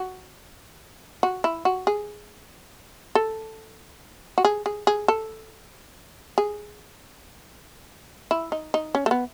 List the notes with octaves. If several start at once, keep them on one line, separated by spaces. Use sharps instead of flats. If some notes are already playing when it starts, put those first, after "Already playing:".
Already playing: F#4
F#4
E4
F#4
G#4
A4
F#4
G#4
G#4
G#4
A4
G#4
E4
D#4
D#4
C#4
A3
B3